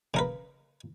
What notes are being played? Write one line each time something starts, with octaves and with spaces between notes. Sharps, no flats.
C#3 A#4 B4